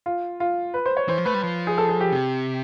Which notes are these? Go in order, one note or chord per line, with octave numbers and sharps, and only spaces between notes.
F4
F4
B4
C5
C#5
E3 C5
F3
A3 B4
G3
F3
G#4
A4
G#4
G4
C3